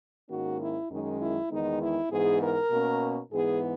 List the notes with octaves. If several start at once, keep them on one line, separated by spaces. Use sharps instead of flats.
G#2 D#3 A#3 C#4 F#4
E4
F#2 D#3 G#3 C#4 D#4
E4
E2 D#3 G#3 B3 D#4
E4
G#2 E3 B3 G#4
A#4
B2 A#3 C#4
G#2 E3 B3 G#4